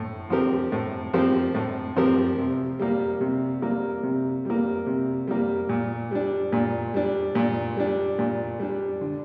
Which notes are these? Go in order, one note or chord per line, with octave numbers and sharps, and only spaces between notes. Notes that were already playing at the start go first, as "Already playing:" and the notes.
Already playing: A2
F3 C4 G4 A#4
A2
F3 C4 G4 A#4
A2
F3 C4 G4 A#4
C3
G3 A#3
C3
G3 A#3
C3
G3 A#3
C3
G3 A#3
A#2
G3 D4
A#2
G3 D4
A#2
G3 D4
A#2
G3 D4
D3